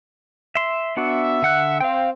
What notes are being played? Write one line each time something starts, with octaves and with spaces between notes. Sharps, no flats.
E5 C6
B3 D4 F#4 E5
D3 F#5 F#6
C4 F5 G5